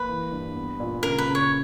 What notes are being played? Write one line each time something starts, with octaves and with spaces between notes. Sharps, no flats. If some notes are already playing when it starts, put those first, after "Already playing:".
Already playing: A#3 B4
E3
G2
B3
A#2
C#3 A#4
B4
C#3
C#5